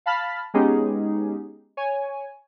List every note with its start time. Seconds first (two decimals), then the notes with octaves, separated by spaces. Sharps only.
0.06 F5 A5 B5 F6 A6 B6
0.54 G#3 B3 C#4 D#4 G4 G#4
1.77 C#5 G#5